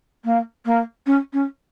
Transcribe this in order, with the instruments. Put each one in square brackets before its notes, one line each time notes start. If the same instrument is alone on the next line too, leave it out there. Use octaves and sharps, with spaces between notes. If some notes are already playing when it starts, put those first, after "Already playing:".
[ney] A#3
A#3
C#4
C#4